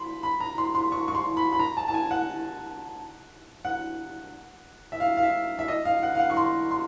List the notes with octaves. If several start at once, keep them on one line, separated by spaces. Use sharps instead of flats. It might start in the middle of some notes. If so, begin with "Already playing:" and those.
Already playing: B5 C6
B5
A#5
C6
C6
C#6
C#6
C6
B5
B5
A#5
A5
A5
G#5
F#5
F#5
E5
F5
F5
E5
E5
D#5
F5
F#5
F5
F#5
C#6
C6
C6